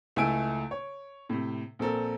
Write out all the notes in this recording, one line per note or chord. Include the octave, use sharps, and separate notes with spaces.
C#2 A3 E4 G#5 E6 D7
C#5
A2 C3
A#1 C4 A4 A#4